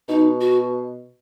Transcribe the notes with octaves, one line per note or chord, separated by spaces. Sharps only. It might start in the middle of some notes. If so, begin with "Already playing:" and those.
B2 D#4
F#4